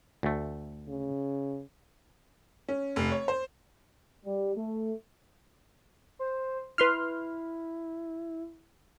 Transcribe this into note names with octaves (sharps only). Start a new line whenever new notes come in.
D2 A3
C#3
C#4
F1
C#5
C5
G3
A3
C5
E4 B4 C6 F6